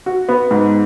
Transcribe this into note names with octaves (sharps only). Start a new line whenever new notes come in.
F#4
B3
G#2